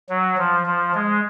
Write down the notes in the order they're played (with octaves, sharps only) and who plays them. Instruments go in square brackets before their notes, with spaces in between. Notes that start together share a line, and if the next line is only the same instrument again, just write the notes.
[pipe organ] F#3
F3
F3
G#3